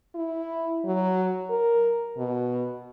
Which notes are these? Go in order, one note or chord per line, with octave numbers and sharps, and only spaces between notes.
E4
F#3
A#4
B2